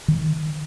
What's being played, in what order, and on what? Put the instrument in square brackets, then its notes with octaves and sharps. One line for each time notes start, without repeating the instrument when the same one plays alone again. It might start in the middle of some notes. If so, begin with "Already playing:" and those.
[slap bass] D#3